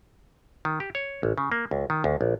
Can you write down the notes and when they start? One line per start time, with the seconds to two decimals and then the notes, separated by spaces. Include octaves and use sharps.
0.65 D#3
0.80 G4
0.95 C#5
1.23 A1
1.38 C#3
1.52 A#3
1.71 C#2
1.90 D#3
2.04 D2
2.21 A#1